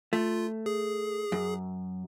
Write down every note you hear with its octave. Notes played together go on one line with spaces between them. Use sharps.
A3 F4
G#4
F#2